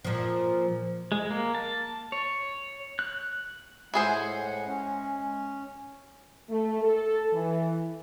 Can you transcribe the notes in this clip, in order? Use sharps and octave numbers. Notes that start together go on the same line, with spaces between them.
A#2 F3
G#3
A#3
A5
C#5
F#6
A2 G#3 E4 G#4 C5 F#5
C#4
A3
A4
E3